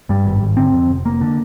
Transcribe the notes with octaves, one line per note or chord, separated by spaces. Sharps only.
G2 G3
G#1
G#1
D3 C4
F2
F1
F1 A#3
D3